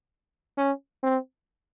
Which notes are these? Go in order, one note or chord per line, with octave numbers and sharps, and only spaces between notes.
C#4
C4